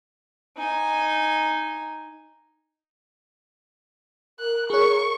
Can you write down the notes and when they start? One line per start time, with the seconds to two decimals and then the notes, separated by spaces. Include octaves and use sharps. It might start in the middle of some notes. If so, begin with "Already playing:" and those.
0.57 D#4 G#5
4.39 A#4 F#6
4.70 G#4 C#5 C#6